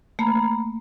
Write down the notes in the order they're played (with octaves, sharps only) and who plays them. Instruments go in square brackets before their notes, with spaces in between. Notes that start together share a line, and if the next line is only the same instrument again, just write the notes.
[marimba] A3 A#3 [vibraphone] A#5 B5